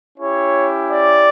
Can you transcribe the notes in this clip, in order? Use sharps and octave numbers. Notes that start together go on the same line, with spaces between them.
C#4 E4 G4 C#5
D5